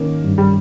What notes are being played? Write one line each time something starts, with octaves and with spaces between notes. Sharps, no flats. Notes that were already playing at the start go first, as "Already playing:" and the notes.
Already playing: D#3 A#3 C#4
G2
G3